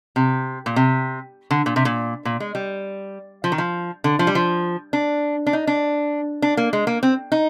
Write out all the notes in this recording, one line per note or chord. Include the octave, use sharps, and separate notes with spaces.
C3
A#2
C3
D3
A#2
C3
A#2
A#2
G#3
G3
F3
D#3
F3
D3
F3
G3
F3
D4
D4
D#4
D4
D4
A#3
G#3
A#3
C4
D#4